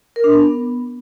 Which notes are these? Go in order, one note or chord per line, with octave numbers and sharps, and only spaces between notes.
A#4
D4
B3